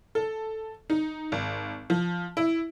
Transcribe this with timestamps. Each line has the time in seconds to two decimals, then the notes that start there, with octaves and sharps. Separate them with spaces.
0.15 A4
0.90 D#4
1.32 G#1
1.90 F3
2.37 E4